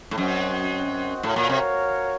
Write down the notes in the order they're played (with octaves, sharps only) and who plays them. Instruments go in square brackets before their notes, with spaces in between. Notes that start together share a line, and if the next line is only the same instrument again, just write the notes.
[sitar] A2
[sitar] F#2 [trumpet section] C4 F#4 C5 D#5 F#5
[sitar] A2 [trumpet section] F#4 A#4 C#5 F5
[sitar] A#2
C3